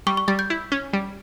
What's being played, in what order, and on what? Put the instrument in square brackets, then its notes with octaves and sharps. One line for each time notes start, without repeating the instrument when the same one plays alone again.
[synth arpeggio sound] G3 [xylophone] C#6
[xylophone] C#6
[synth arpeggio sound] G3 [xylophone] A6
[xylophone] G6
[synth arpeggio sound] E4
C#4
G3